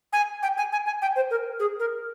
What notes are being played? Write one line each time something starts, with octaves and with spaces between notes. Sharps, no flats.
G#5
G5
G#5
G#5
G#5
G5
C5
A#4
G#4
A#4